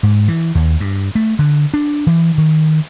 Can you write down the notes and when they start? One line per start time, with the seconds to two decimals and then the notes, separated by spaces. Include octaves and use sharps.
0.03 G#2
0.28 E3
0.55 D#2
0.80 G2
1.15 A3
1.39 D3
1.74 D4
2.07 E3
2.38 D#3